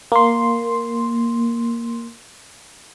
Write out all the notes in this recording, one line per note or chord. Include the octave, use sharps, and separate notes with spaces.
A#3 C6